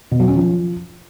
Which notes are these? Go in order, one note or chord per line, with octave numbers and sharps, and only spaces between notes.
B2
F#3
C#4
F3